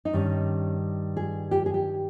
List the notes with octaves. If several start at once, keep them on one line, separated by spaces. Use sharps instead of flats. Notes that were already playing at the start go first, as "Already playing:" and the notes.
D#4
G2 D#3 G3 C#4
G#4
G4
G#4
G4